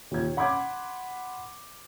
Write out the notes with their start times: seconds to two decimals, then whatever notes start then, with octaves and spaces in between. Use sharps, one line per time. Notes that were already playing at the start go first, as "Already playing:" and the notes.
0.11 D#2 A#2 G#6
0.37 F#5 B5 C6 D6 G#6